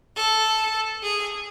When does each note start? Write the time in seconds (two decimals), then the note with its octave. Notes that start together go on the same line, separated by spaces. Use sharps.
0.17 A4
1.03 G#4